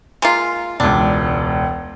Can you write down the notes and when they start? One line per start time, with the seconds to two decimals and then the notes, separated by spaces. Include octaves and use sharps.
0.22 G#3 A#3 F4
0.80 E1 C#2 D4